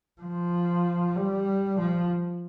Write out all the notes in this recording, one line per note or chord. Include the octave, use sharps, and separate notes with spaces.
F3
G3
F3